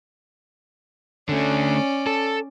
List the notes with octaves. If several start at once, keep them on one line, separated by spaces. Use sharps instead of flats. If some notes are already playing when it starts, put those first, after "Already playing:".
D3 A3 C#4 D5
A4